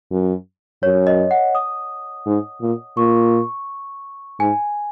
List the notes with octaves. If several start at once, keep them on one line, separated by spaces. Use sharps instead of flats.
F#2
F#2 C#5
D#5
F#5
D#6
G#2
A#2
A#2 C#6
G#2 G#5